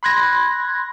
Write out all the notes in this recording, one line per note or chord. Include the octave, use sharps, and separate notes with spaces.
B5 C6 F#6 G#6 A#6